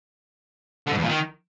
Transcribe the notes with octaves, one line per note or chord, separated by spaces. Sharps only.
D3
G#2
E2
A#2
D#3